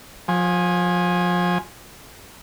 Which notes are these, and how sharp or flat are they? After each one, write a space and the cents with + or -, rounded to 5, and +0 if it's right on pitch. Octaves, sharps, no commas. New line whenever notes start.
F3 +30 G#5 +0